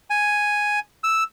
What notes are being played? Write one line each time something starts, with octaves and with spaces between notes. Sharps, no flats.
G#5
E6